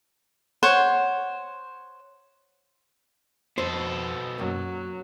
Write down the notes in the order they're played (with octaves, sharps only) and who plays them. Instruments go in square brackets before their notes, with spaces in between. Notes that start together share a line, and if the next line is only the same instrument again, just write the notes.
[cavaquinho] C5 C#5 F#5
[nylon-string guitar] F2 [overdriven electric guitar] B2 A4 [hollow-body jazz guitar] C5
[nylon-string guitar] F#2 A#3 [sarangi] F#3